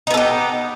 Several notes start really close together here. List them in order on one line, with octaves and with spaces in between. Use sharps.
D#4 B3 A4 G4